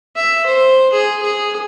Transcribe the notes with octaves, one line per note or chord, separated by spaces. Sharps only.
E5
C5
G#4
G#4